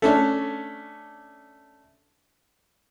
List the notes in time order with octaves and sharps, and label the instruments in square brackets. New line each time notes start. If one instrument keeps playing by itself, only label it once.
[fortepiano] A3 C#4 D4